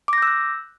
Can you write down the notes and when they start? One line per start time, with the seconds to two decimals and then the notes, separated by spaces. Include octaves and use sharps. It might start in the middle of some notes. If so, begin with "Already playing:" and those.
0.08 D6
0.13 A#6
0.18 G6
0.22 E6
0.27 F#6